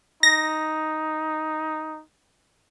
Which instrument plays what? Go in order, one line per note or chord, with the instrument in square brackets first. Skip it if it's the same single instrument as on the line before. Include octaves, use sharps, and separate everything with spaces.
[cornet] D#4 [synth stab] A#6